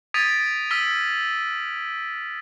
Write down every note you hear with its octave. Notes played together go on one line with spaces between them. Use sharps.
D#6 G#6 A6 B6 D7 D#7
E6 F6 B6 D#7 G7